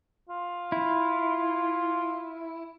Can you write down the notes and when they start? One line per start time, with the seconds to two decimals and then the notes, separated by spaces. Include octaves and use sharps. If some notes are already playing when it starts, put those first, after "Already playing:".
0.29 F4
0.72 E4